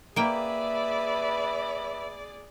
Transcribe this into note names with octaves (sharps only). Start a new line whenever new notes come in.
A#3 G#4 B4 D5 E5 G5